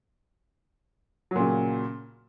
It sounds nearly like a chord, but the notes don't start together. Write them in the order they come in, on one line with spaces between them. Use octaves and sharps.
F#3 A#2 C#3